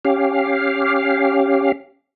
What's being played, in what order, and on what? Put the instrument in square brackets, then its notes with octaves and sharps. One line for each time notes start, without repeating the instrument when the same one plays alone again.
[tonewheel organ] C#4 G4 F5